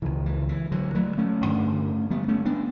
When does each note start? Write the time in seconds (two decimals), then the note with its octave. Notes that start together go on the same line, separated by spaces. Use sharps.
0.02 C#2 C#3 E3
0.26 E3
0.49 E3
0.72 D3 F#3
0.95 F#3 A3
1.18 A3 C#4
1.41 A1 G2 D3
2.10 G3 B3
2.28 A3 C#4
2.45 B3 D4